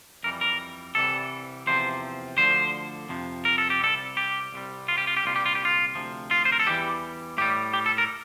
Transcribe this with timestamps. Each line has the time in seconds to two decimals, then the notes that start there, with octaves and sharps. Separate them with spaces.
0.23 F2 E3 G3 A#4
0.41 A#4
0.95 C2 C3 E3 G3 A4
1.67 E2 C3 F3 C5
2.38 D2 D3 F3 C5
3.09 F2 C3 F3
3.45 A#4
3.58 A4
3.70 G4
3.80 C2 C3 G3 A4
4.17 G4
4.52 C2 C3 G3
4.88 F4
4.98 G4
5.07 F4
5.17 G4
5.24 C2 A#2 G3 F4
5.36 G4
5.46 F4
5.55 G4
5.65 F4
5.95 D2 C3 F3
6.31 F4
6.45 C5
6.52 A#4
6.60 A4
6.66 E2 E3 G3 G4
7.38 A2 G3 G4
7.74 G4
7.86 A4
7.98 A#4